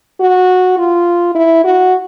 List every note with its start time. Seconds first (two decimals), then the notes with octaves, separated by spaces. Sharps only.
0.21 F#4
0.78 F4
1.35 E4
1.64 F#4